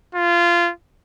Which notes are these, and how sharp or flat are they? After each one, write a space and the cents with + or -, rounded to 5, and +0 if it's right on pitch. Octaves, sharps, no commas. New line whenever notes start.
F4 -20